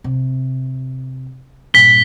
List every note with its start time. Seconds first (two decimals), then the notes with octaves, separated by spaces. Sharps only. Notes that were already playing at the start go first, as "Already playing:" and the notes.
0.04 C3
1.74 G2 A#2 B6 G7